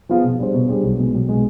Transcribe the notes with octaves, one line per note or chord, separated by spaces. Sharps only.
F3 B3 F4 G#4
B2
G3 D4 G#4 C5
B2
G3 D4 G#4 C5
B1
B2 G#3
B1
B2 G#3